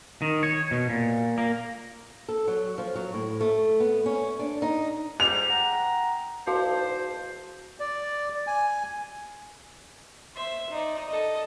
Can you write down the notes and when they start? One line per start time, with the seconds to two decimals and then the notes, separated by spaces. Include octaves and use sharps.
0.22 D#3
0.43 C#5
0.71 B2
0.90 A#2
1.38 A#3
2.29 A4
2.48 F#3
2.78 F3
2.95 F#3
3.14 A2
3.41 A3
3.80 B3
4.06 C#4
4.39 D4
4.62 D#4
5.20 G#2 G3 F7
5.49 F#5 G5 A#5
6.47 E2 G#2 F#4 C5 F5 A5
7.80 D5
8.47 G#5
10.35 C5 E5
10.70 D#4 D5
11.08 A4 D#5